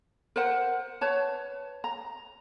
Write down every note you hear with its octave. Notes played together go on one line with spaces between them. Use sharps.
A#4 C5 F#5
B4 C#5 A5
A#5